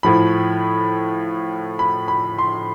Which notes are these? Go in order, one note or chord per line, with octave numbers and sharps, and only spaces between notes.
A2 F3 B5
B5
B5
C6